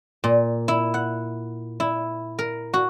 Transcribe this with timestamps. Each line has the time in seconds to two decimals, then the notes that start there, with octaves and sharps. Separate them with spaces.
0.24 A#2
0.68 E4
0.94 F#5
1.80 E4
2.39 A#4
2.74 F#4